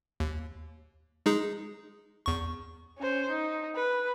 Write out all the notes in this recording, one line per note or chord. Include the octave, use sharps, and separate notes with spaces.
D#2
G#3 D#4 G#4
E2 C#6
C#4 C5
D#4
B4